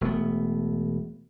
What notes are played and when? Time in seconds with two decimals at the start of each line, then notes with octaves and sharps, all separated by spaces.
0.01 E1 A3 B3